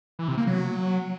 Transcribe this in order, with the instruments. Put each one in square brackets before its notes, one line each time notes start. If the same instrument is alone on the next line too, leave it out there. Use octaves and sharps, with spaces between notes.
[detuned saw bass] E3
C3
A#3
F#3